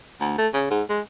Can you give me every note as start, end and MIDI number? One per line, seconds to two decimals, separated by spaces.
0.21 0.38 38
0.38 0.48 57
0.54 0.68 49
0.71 0.82 44
0.89 1.00 56